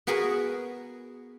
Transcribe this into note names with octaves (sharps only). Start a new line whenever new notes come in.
B3 F#4 G#4 A#4 B4